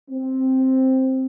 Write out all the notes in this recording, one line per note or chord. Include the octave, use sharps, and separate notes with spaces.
C4